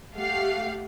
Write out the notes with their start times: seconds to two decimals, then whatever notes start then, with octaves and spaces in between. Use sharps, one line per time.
0.15 A3 G4 F5 F#5